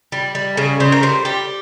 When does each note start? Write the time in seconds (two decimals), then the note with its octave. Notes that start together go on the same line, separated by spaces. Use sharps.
0.12 G3
0.35 G3
0.57 C#3
0.80 C#3 C5
0.92 A#4
1.03 G3 C5
1.25 G3 G4